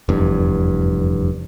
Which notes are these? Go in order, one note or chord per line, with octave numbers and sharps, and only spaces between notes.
F1 E2 G2